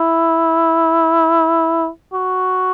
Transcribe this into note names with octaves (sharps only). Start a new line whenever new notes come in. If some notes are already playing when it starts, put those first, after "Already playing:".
Already playing: E4
F#4